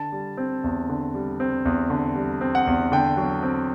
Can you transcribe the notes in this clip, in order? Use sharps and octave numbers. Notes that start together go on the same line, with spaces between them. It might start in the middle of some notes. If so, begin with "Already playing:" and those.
Already playing: D3 A5
G3
C4
E2
D3
G3
C4
E2
D3
G3
C4
F#5
E2
D3 G5
F#3
C4